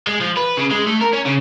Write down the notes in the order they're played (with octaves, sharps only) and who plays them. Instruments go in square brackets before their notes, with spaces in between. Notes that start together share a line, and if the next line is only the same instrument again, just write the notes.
[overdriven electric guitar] G#3
F3
B4
C#3
G#3
A3
A#4
C#4
C#3